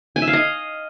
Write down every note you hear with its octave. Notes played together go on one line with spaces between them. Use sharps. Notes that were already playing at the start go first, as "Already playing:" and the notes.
G#5
E5
F5
D#5